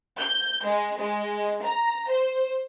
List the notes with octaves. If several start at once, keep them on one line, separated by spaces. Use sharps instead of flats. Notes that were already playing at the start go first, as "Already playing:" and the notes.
G6
G#3
G#3
A#5
C5